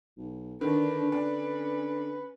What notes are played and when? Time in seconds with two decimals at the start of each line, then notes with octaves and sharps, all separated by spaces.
0.17 B1
0.61 D3 D#3 D4 B4
1.12 C#4 D4